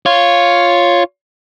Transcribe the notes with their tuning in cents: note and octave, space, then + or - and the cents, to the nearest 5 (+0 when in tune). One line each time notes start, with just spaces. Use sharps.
F4 +0 C#5 +0